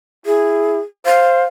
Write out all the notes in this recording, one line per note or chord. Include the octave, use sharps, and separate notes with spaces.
E4 G#4
C5 F5